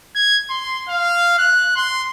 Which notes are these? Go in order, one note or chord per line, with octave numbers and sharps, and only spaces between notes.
G#6
C6
F5
F#6
C6